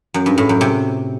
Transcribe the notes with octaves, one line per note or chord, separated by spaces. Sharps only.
F#2
G2
A2
F#2
C3